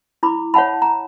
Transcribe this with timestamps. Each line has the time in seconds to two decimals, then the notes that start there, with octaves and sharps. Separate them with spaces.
0.23 E4 B5 D6
0.54 C#5 E5 F#5 A5 B5
0.82 A#5